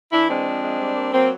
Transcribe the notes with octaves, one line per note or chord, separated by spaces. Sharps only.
E3 D4 E4
G#3 C4 D4
F3
G#3
G3
A#3
F#3 A#3 C4